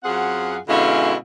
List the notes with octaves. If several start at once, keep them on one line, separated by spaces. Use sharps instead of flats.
F#2 C4 F4 G#4 F#5
B2 D3 G#3 C#4 E4 F5